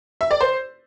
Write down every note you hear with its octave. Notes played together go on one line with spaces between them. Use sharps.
E5
D5
C5